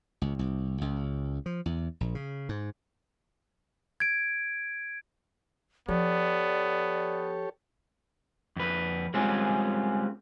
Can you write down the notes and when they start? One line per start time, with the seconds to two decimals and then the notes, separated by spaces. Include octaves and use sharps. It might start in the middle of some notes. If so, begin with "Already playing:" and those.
0.22 C#2
0.39 C2
0.81 C#2
1.46 F3
1.66 E2
2.01 A#1
2.15 C#3
2.49 G#2
4.00 G#6 D7
5.88 F3 B3 G4 A4 C#5 D5
8.56 F2 B4
9.14 G3 G#3 C4 C#4 F4 G#4